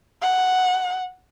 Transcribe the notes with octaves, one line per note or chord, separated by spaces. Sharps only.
F#5